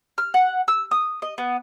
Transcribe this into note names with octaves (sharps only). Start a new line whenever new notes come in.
F6
F#5
E6
D#6
D#5
B3